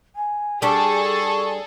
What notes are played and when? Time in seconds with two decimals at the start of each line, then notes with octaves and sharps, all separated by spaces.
0.15 G#5
0.62 G3 D4 G#4 A4 C#6